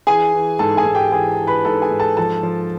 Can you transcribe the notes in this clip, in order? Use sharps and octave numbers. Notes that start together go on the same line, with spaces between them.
E3 G#4 G#5
E3
G#2 A4 A5
G#4 G#5
G#2
G4 G5
E3 G#4 G#5
E3
B4 B5
G#2 A4 A5
G#4 G#5
G#2
A4 A5
F3 A4 A5
F3